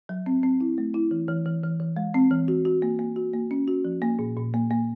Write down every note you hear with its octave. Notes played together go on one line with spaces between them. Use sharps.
F#3
C4
C4
E4
A3
E4
E3
E3
E3
E3
E3
G#3
C4
E3
F#4
F#4
A#3
A#3
F#4
A#3
C#4
F#4
F3
A#3
A#2
A#2
A#3
A#3